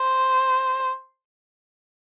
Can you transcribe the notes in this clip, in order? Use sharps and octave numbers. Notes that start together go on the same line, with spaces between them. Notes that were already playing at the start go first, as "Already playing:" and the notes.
Already playing: C5